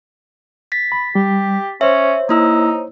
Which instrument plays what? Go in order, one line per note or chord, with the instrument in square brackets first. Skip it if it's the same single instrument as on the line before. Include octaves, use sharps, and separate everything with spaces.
[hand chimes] A6 B6
[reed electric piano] B5
[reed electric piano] G3 [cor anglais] G4
[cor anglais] C#4 [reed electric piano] C5 C#5 [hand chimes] E5
[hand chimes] A#3 E4 E6 [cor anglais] D#4